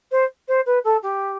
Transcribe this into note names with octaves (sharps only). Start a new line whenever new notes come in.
C5
C5
B4
A4
G4